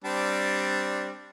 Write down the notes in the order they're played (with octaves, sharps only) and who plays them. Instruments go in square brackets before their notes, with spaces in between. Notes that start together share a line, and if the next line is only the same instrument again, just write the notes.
[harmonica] G3 C4 D4